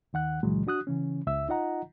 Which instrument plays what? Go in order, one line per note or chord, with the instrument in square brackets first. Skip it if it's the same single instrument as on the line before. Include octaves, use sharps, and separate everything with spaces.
[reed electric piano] D#2 D#3 F#5 F#6
C#2 A#2 C#3 E3 F#3 G#3
D4 F#4 D#6 F#6
C#3 E3 C#4
C#2 E5 E6
D#4 F4 D#5 F#5 A#5